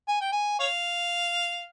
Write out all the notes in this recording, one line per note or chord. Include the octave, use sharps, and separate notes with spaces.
G#5
G5
G#5
C#5 F5